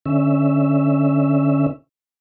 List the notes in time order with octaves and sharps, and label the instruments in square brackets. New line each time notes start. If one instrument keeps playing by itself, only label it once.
[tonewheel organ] D3 C#4 E5